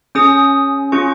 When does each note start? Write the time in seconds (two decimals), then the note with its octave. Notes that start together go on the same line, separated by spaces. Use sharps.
0.15 C#4 G#4 D#6
0.92 C#4 F4 G#4 C#6